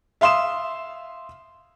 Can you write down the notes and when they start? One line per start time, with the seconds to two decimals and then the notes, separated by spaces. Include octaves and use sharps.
0.21 E5 F5 C6 D#6 E7